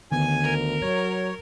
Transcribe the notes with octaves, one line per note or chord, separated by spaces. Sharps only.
D2 D3 D#3 B3 G#5
A#4
F#3 C#5 G#6